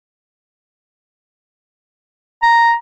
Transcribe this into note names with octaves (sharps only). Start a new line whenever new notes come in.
A#5